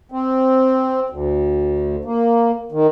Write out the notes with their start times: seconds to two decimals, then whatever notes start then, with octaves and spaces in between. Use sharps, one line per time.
0.12 C4
1.10 D2
2.05 A#3
2.72 D#3